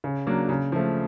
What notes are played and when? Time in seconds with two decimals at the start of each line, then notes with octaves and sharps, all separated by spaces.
0.04 C#3
0.27 F#3 A#3 D4
0.49 C#3
0.72 F3 A3